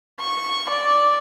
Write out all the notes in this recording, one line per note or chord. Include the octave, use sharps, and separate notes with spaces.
C#6
D5